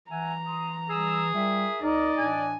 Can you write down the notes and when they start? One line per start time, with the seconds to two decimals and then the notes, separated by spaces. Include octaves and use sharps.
0.11 E3 E5 F#5 G#5 A#5
0.47 C6 D#6
0.90 G3 G#4 E6
1.34 G3 F4 A#4 E5
1.82 C#2 D#4 A#4 D5 D#5
2.18 A2 E3 D4 G#5